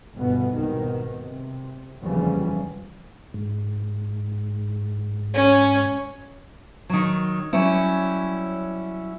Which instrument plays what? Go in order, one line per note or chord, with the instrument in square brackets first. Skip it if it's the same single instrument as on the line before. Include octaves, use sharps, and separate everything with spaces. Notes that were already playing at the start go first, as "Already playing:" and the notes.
[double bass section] G1 B2 B3
C2 G#2 B2 D#3
C3
F1 D#2 C#3 E3 F3 G3
[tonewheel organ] G#2
[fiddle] C#4 C#5
[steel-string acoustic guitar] D#3 F#3
F#3 G3 C#4 E4